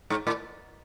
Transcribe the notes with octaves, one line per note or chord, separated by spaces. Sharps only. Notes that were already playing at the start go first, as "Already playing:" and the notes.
G#2
A2